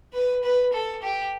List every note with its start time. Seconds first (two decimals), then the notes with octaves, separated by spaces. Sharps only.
0.13 B4
0.43 B4
0.73 A4
1.02 G4